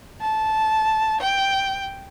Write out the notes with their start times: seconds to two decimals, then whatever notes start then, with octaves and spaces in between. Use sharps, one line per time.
0.20 A5
1.21 G5